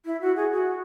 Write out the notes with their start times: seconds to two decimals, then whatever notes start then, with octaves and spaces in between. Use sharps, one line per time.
0.06 E4
0.21 F#4
0.36 G#4
0.52 F#4